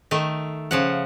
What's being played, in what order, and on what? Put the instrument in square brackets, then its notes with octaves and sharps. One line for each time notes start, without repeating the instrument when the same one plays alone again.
[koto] D#3 A3
C#3 F3 F#5